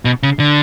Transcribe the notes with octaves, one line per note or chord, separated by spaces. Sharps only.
B2
C#3
D3